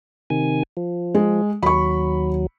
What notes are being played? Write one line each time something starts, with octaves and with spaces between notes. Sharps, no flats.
C3 D#3 G#5
F3
G#3
D#2 F#3 B5 C#6